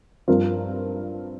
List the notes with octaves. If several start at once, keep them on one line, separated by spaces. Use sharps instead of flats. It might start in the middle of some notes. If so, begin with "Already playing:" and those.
G2 F3 C4 F4 A#4